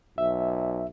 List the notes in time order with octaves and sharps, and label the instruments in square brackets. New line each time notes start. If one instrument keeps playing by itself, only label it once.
[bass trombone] B1 [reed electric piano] E5